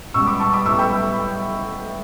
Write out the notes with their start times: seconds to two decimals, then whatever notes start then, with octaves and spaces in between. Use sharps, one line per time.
0.14 C#2 B2 G3 B3 C#6 E6
0.26 B5 D6
0.40 A5 C#6
0.53 B5 D6
0.66 B1 A2 G3 B3 C#6 E6
0.78 G5 B5